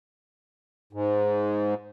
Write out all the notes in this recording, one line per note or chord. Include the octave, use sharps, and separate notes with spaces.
G#2